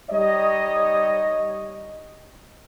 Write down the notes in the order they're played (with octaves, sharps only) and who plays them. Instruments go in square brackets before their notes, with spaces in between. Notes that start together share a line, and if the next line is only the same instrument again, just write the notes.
[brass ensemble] G3 D#4 C#5 D#5